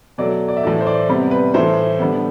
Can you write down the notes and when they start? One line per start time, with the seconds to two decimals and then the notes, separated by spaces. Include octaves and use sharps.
0.18 B2 F#3 A3 D5
0.48 D5
0.57 E5
0.63 A2 E3 A3 D5
0.81 C5
0.87 D5
1.09 C3 G3 B3
1.31 B4
1.54 A2 E3 A3 C5
1.99 D3 G3 B3